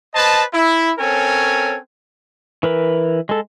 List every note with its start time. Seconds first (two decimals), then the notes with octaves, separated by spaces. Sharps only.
0.14 B4 C5 D#5 A5
0.54 E4
0.99 C4 C#4 A4 A#4 C#5 G#5
2.63 E3 A#4 B4
3.29 G#3 A4